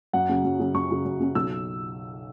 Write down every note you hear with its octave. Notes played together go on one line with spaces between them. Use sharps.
F#2 F#5
C#3 F#3 C#4
F#2
C#3 F#3 C#4
F#2 C#6
C#3 F#3 C#4
F#2
C#3 F#3 C#4
B1 E6